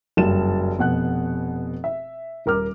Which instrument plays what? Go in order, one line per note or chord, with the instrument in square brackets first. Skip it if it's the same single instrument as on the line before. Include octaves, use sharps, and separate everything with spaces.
[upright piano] F#1 G2 A5 E7
F1 B2 F#5 F#6
E5
D#1 A#4 D6 F6